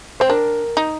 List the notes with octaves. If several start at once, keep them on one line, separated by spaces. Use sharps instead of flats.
C4 C5
D4 A#4
D#4